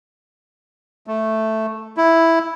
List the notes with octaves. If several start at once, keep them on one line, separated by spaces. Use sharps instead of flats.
A3
E4